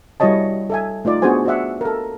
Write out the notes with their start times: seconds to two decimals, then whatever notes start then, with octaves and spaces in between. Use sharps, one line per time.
0.20 G3 E4 F#4 C#5 D#5 A5
0.70 A4 E5 G#5
1.05 A3 D#4 F4 D5
1.22 B3 D4 F#4 G#4 C5 G#5
1.45 F#4 C5 D5 E5 F#5
1.81 A4 A#4